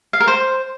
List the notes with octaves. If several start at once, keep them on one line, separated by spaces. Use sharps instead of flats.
F5
A#4
C5